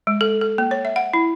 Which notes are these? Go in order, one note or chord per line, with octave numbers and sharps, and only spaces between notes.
G#3
A4
A4
A#3
C#5
E5
F#5
E4